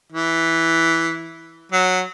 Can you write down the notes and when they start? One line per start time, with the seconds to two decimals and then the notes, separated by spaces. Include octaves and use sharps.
0.12 E3
1.72 F#3